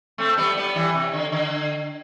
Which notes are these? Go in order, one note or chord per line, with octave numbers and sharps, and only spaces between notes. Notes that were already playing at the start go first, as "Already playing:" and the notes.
A3 C4
G3 B3
G3 B3
E3 G3
C3
D3
D3